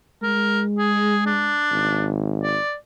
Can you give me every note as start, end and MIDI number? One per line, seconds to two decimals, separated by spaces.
0.22 1.60 56
0.22 0.62 70
0.78 1.24 68
1.26 2.11 62
1.71 2.58 32
2.43 2.75 74